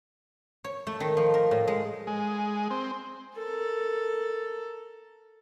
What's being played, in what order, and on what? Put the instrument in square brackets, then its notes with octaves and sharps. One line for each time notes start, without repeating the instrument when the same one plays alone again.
[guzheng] C#5
A3
D#3
F3
A#4
A2
G#3
[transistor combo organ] G#3
C4
[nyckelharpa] A4 A#4